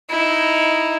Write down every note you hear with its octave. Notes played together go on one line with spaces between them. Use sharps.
D#4 E4